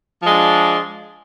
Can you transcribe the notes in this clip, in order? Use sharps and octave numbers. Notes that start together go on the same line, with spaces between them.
F3 G#3 D4